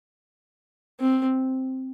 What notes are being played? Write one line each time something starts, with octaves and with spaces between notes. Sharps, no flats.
C4